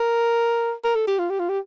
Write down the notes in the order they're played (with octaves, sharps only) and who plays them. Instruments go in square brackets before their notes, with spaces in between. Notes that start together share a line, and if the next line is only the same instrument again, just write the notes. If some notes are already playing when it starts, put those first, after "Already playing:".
Already playing: [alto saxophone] A#4
A#4
A4
G4
F4
G4
F4
G4